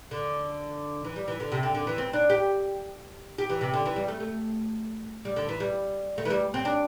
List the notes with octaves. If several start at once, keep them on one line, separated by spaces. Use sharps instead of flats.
D3
E3
G3
E3
D3
C3
D3
D3
E3
C4
D4
G4
G4
E3
C3
D3
E3
G3
A3
A3
G3
D3
E3
G3
A3
E3
G3
C4
D4